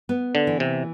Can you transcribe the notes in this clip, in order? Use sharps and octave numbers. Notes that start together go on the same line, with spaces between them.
B3
D3
E3
C3